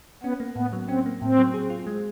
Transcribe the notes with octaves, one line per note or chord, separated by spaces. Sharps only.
B3 C#4
A#3
A2 B3
F#3
C4 C#4
A#3
A2 C4
F#3
G#4
F4
G#3